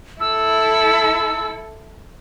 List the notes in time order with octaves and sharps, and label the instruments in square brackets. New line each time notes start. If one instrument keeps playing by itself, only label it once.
[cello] E4 A4 [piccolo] E6